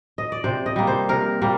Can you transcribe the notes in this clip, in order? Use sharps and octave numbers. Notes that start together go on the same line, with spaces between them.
D#5
D5
C3 C5
D#5
G3 A#3
C5
C3 A#4
G3 A#3